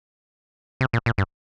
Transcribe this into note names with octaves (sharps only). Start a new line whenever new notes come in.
C3
A#2
A#2
G2